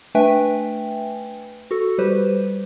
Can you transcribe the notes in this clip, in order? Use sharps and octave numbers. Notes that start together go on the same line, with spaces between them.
A3 D4 B4 E5 G5 G#5
F#4 A4
G3 G4 B4 C5